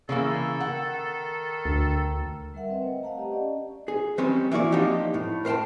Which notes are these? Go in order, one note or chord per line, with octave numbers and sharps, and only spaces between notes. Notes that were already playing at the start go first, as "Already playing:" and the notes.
C#3 E3 A#3 A4
D#3 F#5
D2
G3 A#4 E5 F#5
C4 B4 D#5 G5
A3 C5
D#5 F5 F#5 A5 A#5
G4 D#5 A5
C#4 D5 D#5
G#4
D#3 G3 C4 C#4 G4 C5
E3 A#3 E4 F#4 D5
F3 A#3 C4 D4 D#4 G4
A2
A#4 C5 F5 G5 A5